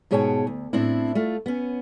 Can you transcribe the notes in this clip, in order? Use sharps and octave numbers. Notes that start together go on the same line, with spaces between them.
G#2 B2 G#4 C#5 G5 A5
D2
A2 C4 D4 E4
A3 F4
B3 C#4